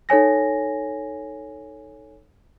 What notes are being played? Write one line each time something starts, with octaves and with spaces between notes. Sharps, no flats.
D#4 A4 C#5 G#5 A#6